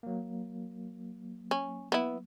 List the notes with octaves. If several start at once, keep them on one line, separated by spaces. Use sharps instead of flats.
F#3 A#3
C#4
B3 E4